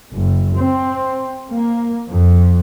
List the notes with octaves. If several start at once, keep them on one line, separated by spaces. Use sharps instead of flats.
F#1
C4
A#3
F2